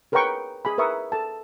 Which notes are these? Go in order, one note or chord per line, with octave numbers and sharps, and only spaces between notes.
G#4 A#4 B4 C#5 G5 C#6
G#4 G#5 B5
A#4 B4 E5 C#6 D#6
A4 A5